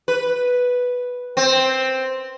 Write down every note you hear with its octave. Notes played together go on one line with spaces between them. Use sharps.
B4
C4